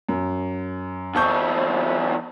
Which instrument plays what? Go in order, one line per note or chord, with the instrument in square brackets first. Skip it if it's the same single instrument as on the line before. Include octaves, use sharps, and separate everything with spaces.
[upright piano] F#2
[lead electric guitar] E2 C4 [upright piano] A5 C#6 G6